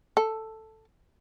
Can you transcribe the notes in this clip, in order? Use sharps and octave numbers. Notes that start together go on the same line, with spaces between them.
A4